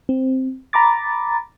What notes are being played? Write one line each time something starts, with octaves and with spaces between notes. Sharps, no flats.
C4
A#5 B5 D6 A6